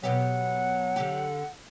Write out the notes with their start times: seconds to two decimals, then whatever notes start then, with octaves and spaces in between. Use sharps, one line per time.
0.03 B2 F#3 B3 G4 F#5
0.96 D3 G4